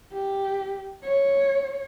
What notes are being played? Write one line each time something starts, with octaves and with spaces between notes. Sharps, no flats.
G4
C#5